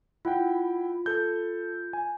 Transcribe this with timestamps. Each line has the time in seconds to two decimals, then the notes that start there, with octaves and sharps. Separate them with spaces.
0.25 E4 F4 F#5 G5
1.06 A4 G6
1.93 G#5